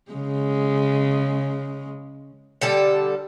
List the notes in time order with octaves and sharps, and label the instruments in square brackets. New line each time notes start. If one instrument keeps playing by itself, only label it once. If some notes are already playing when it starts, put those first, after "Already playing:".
[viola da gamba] C#3 G#3
[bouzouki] D3 G3 A4